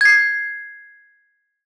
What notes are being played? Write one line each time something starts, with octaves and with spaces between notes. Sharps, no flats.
G#6 C7